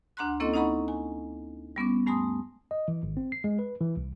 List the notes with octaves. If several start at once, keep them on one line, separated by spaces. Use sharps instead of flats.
D2 D4 F#5 A#5 C6 F#6
A#3 C4 C#4 E4 A4 D#5
D#4 D#5 F#5 A#5 B5 C#6
G#5
G3 B3 C#4 D6
G2 A3 G#5 C6 D#6
D#5
E3
G#1
C4
C7
G#3
B4
E3
C2